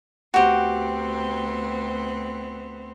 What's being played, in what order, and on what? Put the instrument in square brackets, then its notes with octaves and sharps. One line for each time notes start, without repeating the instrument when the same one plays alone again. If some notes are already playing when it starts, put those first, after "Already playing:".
[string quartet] D2 B3 C4 [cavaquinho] F#4 G4